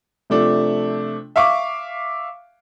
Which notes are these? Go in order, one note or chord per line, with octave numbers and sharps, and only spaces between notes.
C3 F3 A3 D4
E5 F5 C#6 D6